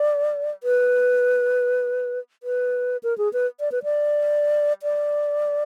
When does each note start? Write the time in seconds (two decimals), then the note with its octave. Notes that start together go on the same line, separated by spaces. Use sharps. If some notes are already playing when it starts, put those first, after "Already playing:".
Already playing: D5
0.63 B4
2.43 B4
3.03 A#4
3.18 G#4
3.33 B4
3.60 D5
3.72 B4
3.84 D5
4.83 D5